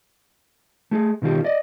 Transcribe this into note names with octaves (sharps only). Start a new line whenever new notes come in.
A3 G#4
B2 D#3 F4 G4
D5 D#5